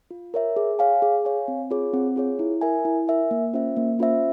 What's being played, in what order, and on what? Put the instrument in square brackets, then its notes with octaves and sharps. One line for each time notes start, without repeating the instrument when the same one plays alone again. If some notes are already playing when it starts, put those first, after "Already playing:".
[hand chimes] F4
A#4 C#5 E5
G#4
C#5 F5 G#5
G#4
C#5 F5 G#5
C4
F4 G#4 C#5
C4
F4 G#4 C#5
E4
A#4 E5 G#5
E4
A#4 E5 G#5
A#3
C#4 F4 C5 E5
A#3
C#4 F4 C5 E5